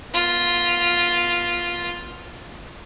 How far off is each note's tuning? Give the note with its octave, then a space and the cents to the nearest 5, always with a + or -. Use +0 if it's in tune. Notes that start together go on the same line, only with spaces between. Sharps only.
B3 -30 F4 +0